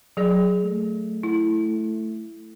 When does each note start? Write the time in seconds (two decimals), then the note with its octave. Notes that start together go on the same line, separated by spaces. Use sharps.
0.17 F#3 G#4 D5
0.64 A3
1.23 E4